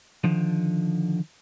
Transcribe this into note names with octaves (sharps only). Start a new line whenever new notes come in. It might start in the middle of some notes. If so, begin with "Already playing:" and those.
D3 D#3 F3